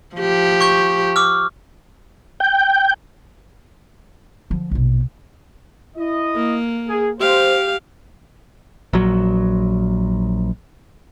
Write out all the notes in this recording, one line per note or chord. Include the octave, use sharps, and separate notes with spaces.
F3 G4
C#6 G6
D6 E6 F6
G5
D3 F3
A#1 B2
E4 D#5
A#3
G#4
G4 C5 F5
A#1 F#3